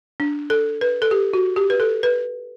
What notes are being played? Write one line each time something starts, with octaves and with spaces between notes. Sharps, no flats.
D4
A4
B4
A4
G4
F#4
G4
B4
A4
B4